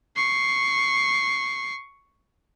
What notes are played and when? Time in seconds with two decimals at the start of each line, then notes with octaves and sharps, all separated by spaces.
0.16 C#6 C7